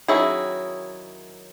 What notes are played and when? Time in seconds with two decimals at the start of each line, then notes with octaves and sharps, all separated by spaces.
0.08 D#3 F#3 C#4 E4 G#4